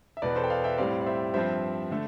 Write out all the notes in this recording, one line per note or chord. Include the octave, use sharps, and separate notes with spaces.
E5
E2 B2 B3 B4 D5
A4 C5
G5
D5 F5
E5 G5
A2 G3 C4 D5 F5
D5
C5 E5
G2 F3 C4 C5 E5
D3 A3